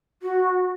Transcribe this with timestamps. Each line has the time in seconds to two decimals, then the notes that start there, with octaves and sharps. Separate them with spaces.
0.23 F#4